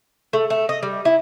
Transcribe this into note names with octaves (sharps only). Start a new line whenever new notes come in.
A3
A3
D#5
G3
E4